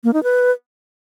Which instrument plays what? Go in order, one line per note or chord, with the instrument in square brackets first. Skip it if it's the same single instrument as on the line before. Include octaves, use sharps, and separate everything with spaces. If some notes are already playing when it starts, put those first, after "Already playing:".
[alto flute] A#3
D#4
B4